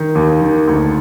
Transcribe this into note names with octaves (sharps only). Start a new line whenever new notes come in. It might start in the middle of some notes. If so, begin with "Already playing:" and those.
Already playing: D#3
D#2
D#3
D2